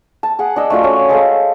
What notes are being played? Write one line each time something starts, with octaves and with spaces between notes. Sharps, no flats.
A5
G#4 F#5
D4 D#5 E6
A3 D4 F4 F#4
C#4
G#3 A4 C5 F5